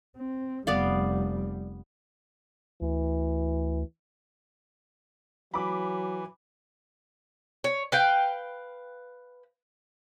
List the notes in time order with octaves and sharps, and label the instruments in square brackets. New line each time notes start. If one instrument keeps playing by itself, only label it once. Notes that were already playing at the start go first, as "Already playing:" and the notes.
[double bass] C4
[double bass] F1 G3 [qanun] B3 D5 F5
[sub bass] D2 [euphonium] E3
[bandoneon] E3 [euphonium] F#3 [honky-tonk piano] B5 D6
[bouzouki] C#5
B4 F5 G5